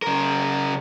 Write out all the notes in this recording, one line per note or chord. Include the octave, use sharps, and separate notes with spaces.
C#3 A#4